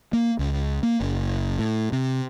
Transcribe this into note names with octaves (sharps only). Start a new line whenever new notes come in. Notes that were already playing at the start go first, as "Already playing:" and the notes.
A#3
C#2
A#3
F#1
A2
C3